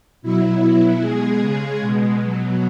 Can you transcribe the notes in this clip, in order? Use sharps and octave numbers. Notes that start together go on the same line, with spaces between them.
B2 F#3 E4
B2 F#3
B2 G#3 G#4
C#3 G#3 G#4
B2 G#3
B2 F#3